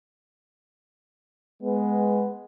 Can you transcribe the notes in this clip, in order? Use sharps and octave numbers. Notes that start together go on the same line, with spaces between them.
G#3 B3